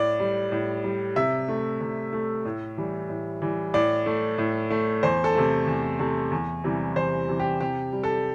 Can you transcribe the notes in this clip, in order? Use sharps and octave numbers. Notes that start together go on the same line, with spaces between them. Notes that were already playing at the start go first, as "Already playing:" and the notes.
Already playing: A2 D5
G3
A2
G3
C3 E5
A3
C3
A3
A2
E3 G3
A2
E3 G3
A2 D5
A3
A2
A3
E2 C5
A4
C3 A3
E2
C3 A3
E2
C3 E3 G3
E2 C5
C3 E3 G3
G4
C3 G4
G3
A4